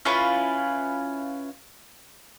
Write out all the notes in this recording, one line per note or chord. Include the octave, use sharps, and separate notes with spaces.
C#4 E4 F4 B4